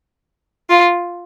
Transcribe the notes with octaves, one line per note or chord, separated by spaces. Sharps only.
F4